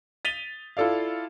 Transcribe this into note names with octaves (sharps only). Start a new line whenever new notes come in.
A6 B6 D#7 F7 G7
E4 F4 A4 D5 F5